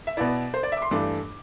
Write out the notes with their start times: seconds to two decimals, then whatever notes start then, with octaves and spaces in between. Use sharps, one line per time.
0.07 E5
0.17 B2 B3 E4 D5
0.54 C5
0.63 D5
0.72 E5
0.77 D6
0.82 C6
0.91 G2 E3 A3 D4 D6